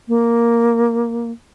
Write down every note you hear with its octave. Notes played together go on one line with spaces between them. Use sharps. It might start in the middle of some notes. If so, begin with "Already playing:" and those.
A#3